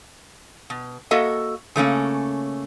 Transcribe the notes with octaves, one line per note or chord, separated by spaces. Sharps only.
B2
A#3 F#4 A4 D#5 E5
C#3 A3 A#3 C#4